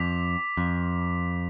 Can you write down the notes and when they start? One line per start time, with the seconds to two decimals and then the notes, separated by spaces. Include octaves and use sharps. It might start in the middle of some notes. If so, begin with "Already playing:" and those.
Already playing: F2 D6 B6 F7
0.57 F2